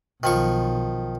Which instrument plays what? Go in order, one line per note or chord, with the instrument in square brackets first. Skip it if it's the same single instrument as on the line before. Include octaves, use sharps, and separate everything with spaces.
[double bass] B1 [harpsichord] D#3 F3 C#6